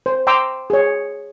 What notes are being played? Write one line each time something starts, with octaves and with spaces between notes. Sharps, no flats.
C5
G5 A#5 C6 D6 E6
G#4 C#5